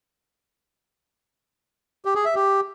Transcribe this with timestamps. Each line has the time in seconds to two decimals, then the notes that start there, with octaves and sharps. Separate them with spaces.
2.05 G4
2.15 G#4
2.25 E5
2.35 G4